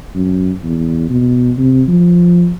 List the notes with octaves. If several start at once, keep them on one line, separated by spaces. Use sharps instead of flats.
F#2
E2
B2
C3
F3